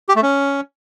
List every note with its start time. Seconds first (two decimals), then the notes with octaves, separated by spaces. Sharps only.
0.09 G4
0.16 A3
0.22 C#4